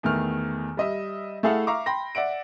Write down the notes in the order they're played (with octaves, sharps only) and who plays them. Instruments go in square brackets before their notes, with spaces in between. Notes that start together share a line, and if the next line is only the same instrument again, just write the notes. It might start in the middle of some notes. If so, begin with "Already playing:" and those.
[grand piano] E2 D#3 A3 F6
G3 D#5 E5
A3 E4 G#4 A4 F5 F#5
E5 F5 A#5 C#6 D6
G5 B5 C6 A#6
D5 E5 F#5 D7